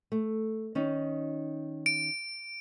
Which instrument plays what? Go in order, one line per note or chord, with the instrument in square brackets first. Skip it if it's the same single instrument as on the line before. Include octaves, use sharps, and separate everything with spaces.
[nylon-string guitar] A3
D#3 C#4 D#4
[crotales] D7